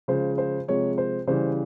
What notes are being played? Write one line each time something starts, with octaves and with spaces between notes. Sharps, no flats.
C#3 F3 G#3 C5
C5
C3 F3 G#3 C#5
C5
C#3 E3 G3 C5